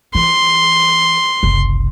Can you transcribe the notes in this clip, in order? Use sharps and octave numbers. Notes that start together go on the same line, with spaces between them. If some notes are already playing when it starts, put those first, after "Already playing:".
E3 C6
F#1 C2